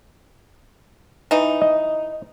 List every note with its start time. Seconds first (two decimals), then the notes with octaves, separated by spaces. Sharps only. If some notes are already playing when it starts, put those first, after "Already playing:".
1.31 E3 D#4
1.62 D#5